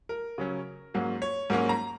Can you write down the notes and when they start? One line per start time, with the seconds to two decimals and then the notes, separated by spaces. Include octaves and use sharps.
0.09 A#4
0.38 C#3 F#3 C#4
0.94 G#2 F#3 A#3 C#4
1.22 C#5
1.50 G#2 F#3 A#3 C#4 A#4
1.69 A#5